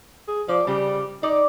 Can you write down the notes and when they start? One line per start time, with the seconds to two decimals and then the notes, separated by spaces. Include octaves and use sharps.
0.28 G#4
0.49 F3 D5
0.67 C#3 G3 G4
1.23 D#4 D5